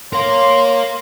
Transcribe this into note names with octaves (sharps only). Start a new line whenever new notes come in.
A#4 C#5 F5 C6